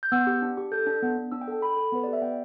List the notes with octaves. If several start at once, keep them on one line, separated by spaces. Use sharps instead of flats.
G6
B3 E6
G4
D4
G4
A4 G6
D4
B3
B3
D4 E6
G5
A4
A4 B5
A4
B3 B4
G4 D5
E5
B3 G5